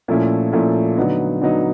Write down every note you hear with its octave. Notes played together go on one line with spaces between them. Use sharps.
A#2 F3 A3 C#4 E4
A#2 F3 A3 C#4 E4
D3 F#3 B3 D#4
D3 F#3 B3 D#4